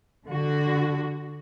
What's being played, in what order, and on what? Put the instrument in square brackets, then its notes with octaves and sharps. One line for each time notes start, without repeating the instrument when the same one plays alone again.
[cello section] D3 F#4